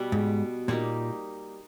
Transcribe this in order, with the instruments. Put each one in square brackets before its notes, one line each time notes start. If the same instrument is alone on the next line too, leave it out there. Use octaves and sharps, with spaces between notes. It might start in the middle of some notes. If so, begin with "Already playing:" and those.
Already playing: [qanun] B2 G3 B3
[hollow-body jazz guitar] G#2
[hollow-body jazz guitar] A#2 [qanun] G3 A#3 D#4